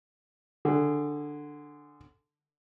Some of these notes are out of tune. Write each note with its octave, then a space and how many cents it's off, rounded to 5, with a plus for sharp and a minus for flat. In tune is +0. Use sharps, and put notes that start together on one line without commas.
D3 +10 G#4 -15